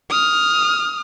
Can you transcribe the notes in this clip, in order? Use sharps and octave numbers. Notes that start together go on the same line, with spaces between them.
D#6 F6